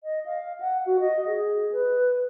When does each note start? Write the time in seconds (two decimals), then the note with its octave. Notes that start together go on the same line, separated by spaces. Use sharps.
0.04 D#5
0.26 F5
0.60 F#5
0.86 F#4
1.00 D#5
1.26 G#4
1.72 B4